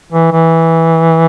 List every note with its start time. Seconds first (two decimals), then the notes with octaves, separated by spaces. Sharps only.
0.12 E3
0.31 E3